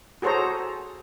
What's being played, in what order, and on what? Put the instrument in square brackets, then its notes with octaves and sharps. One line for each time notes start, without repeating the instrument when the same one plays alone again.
[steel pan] F#4 G#4 A4 C5 C#5 A#5